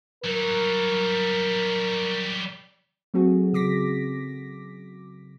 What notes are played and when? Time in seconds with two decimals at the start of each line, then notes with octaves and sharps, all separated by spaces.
0.24 F#3 G3 A#4
3.14 F#3 A3 C4 F#4 G#4
3.53 C#3 D6 A#6 B6